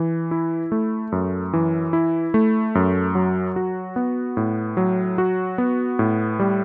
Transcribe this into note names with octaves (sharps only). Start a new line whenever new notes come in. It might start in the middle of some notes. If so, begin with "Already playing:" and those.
Already playing: E3
E4
A3
F#2
E3
E4
A3
F#2
F#3
F#4
B3
A2
F#3
F#4
B3
A2
G3